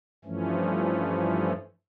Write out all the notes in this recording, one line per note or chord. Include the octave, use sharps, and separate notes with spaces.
G2 E3 F3 A3 C#4